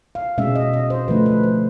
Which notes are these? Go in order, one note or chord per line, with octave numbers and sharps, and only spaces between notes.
F5
B2 G#3 C#4 E5
D#5
D#5
C5
D3 F3 A3 D4 B4
B4
C5